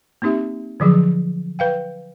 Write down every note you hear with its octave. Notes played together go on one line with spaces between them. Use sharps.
A#3 C4 D#4 G4 E5
D3 F3 F#3 G#4
B4 F5 G5